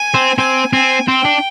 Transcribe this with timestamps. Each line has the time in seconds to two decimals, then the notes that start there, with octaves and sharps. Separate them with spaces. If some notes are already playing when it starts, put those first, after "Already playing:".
Already playing: G#5
0.14 C4
0.38 C4 G#5
0.72 C4 G#5
1.08 C4 G5
1.25 D4